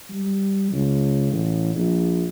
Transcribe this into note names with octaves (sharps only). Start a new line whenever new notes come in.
G3
C#2
A1
A#1